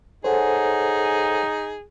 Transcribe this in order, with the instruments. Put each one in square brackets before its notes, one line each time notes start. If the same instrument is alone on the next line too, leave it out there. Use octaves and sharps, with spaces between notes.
[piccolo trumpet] D#4 [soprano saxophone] G#4 [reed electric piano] A4 C5 [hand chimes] C#5 F#5 G#5